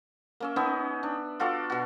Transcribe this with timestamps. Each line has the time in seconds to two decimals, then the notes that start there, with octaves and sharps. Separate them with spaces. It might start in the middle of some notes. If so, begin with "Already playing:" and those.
0.40 A#3 C#4 E5
0.56 B3 C#4 D#4 E5
1.03 D4
1.40 F4 F#4 A4 D5
1.70 B2 F#4